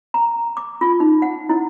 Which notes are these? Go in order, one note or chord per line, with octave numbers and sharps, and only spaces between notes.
A#5
D6
F4
D#4
F#5
E4